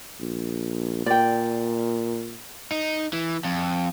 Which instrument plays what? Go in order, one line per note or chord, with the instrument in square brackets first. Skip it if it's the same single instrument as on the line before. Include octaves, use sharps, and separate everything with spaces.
[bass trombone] A#1
[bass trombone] A#2 [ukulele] D5 G5
[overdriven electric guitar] D#4
E3
F2